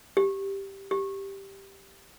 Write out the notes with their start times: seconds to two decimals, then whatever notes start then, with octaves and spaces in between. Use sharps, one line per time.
0.17 G4
0.91 G4